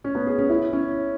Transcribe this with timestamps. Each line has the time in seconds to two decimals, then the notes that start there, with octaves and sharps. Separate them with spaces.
0.04 C#4
0.15 B3
0.27 G#4
0.38 C#4
0.49 E4
0.73 C#4